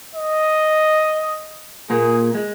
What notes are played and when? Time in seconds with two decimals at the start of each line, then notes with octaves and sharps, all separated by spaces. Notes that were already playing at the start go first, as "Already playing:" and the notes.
0.15 D#5
1.90 A#2 A#3 G#4
2.34 G#3